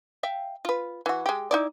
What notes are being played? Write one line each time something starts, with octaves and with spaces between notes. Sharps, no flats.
E5 F5 G5
F4 B4
E3 F#4
G#3 G4
D#4 E4 D5